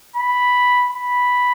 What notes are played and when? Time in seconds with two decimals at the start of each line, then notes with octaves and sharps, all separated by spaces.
0.16 B5
0.90 B5